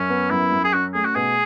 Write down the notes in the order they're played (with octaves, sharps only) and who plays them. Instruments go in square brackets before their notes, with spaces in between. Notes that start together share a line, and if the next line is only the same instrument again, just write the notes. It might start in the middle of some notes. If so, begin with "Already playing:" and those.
Already playing: [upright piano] F#2 [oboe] C#4
[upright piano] B3
[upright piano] F#2 [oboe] E4
[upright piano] F#2
[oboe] G#4
[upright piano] C#4 [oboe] F#4
[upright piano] A3 [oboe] G#4
[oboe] F#4
[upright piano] B2 [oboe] G#4